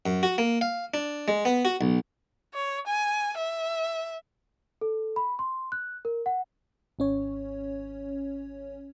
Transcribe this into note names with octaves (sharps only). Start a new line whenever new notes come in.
F#2
F#4
A#3
F5
D4
G#3
B3
F#4
B1
C#5
G#5
E5
A4
B5
C6
F#6
A#4
F#5
G#1 C#4 C#5